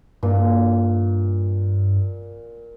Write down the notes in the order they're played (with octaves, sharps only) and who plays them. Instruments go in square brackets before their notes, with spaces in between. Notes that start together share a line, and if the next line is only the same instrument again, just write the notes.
[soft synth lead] G2 [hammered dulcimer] A#2